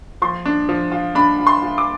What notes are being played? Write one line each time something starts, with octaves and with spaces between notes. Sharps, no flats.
F3 C6
D4
F3
F4
D4 B5
F4
C6
F4
D6